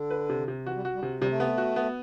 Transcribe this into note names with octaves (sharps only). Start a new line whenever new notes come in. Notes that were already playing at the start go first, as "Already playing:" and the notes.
Already playing: D3
B4
C3
C3
E3 F#4
G3
F#4
G3
C3
C3 G3
A3
B3
F#4
B3